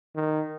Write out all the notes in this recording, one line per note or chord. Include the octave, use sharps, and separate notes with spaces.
D#3